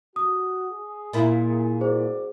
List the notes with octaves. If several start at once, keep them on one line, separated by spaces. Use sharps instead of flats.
F#4 D#6
G#4
A#2 A#3 E4
C2 F#4 G#4 C5 D5